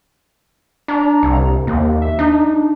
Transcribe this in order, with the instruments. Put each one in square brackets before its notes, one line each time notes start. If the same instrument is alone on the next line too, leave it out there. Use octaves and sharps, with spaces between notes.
[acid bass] D4 [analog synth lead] A#5
[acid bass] C2
[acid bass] D#2 [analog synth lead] A#3
[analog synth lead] E5
[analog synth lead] D4 [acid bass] D#4